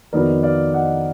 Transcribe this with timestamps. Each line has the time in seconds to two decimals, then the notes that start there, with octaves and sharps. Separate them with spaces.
0.13 F2 D#3 F#3 B3 D#4 A#4 D5
0.43 D5 F5
0.74 D#5 F#5